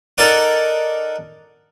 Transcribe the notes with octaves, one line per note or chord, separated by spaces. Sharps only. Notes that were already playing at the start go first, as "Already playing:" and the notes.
D#4 A4 A#4 D5 F#5 D6